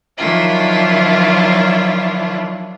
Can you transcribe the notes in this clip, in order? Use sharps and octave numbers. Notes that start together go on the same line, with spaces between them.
D#3 F3 F#3 D4 E4 F4